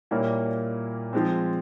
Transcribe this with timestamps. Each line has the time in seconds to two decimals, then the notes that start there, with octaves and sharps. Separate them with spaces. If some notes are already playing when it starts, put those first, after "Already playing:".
0.11 A#2 G3 A#3 C#4 E4
1.13 F3 G#3 C4